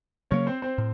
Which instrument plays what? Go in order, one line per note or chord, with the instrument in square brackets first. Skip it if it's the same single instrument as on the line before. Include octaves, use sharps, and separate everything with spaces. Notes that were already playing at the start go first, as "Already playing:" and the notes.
[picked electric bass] C#3 F#3 A#3 [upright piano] C#4 C#5
[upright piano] C4 C5
C4 C5
[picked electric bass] A2